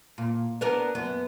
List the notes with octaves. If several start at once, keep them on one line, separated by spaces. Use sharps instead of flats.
A#2
B3 D4 A#4
F#2 B3